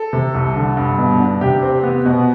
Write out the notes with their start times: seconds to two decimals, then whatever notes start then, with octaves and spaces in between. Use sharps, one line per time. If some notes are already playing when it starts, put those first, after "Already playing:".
Already playing: A4
0.13 C3
0.35 C2
0.56 D3
0.77 G2
0.98 B2
1.20 D4
1.41 C3 G4
1.62 C4
1.84 B3
2.05 B2